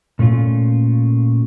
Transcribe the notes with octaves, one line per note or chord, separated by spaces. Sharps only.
A#2 A3 C#4 F4